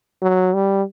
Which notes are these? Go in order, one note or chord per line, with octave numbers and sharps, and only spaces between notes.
F#3
G3